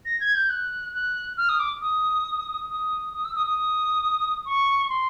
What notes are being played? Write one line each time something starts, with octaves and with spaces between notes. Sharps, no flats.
A#6
G#6
G6
F#6
F#6
F6
D#6
D6
D#6
D#6
D#6
E6
D#6
D#6
C#6
C6